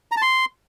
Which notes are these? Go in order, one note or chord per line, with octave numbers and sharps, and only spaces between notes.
A#5
A5
C6